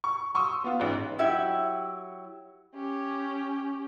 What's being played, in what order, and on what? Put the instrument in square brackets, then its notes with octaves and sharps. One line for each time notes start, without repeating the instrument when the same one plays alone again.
[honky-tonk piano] C#6
C6 C#6 D#6 E6
B3 F4
A1 G#2
[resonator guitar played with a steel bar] F#3 E4 G4 E5
[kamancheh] C#4 G4